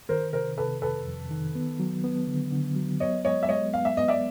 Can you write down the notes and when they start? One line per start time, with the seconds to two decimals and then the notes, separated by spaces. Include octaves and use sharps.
0.09 D#3 A#4 C5
0.33 C3 A#4 C5
0.57 C3 A4 B4
0.82 F2 A4 B4
1.06 F2
1.31 D#3
1.55 B3
1.80 F#3
2.04 B3
2.28 D3
2.52 D3
2.76 F#3
3.00 B3 C#5 D#5
3.25 G#3 C#5 D#5
3.43 E5
3.49 G#3 C#5 D#5
3.74 B3 F5
3.85 E5
3.97 B3 D#5
4.08 D5 E5